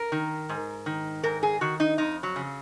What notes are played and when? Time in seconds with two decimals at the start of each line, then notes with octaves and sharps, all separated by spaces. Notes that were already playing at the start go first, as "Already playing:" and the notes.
Already playing: A#4
0.12 D#3
0.49 G#2
0.86 D#3
1.23 G#2 A#4
1.43 G#4
1.61 D#3 F#4
1.80 D#4
1.98 F2 D#4
2.23 F#3
2.36 C#3